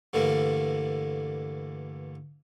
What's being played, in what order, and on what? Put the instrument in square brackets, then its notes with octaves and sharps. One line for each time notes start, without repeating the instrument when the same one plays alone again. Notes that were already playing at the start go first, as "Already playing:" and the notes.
[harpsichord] G2 D3 E3 A3 A#3